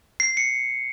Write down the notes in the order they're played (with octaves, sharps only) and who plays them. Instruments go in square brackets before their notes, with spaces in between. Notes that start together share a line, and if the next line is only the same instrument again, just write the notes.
[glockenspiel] C7
C#7